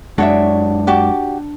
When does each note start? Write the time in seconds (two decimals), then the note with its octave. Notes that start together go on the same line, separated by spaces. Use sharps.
0.18 F#2 G#3 D4 F#4 C#5 E5
0.87 F#4 G4 D5